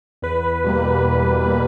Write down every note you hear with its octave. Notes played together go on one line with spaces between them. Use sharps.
E2 B4
B2 G3 A#3
E2
B2 G3 A#3